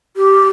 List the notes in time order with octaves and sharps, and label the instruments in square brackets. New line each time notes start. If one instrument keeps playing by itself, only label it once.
[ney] G4